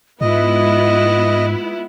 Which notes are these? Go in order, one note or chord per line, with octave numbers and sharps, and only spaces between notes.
G#2 G#3 B3 E4 F4 D#5